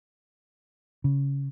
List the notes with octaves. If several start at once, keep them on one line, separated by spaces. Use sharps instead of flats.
C#3